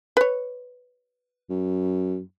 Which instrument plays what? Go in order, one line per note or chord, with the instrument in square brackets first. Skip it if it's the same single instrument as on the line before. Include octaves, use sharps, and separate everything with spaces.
[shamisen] B4 C#5
[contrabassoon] F#2